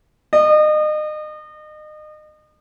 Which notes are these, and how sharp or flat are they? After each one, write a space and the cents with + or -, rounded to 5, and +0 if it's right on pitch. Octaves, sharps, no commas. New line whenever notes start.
D#5 -35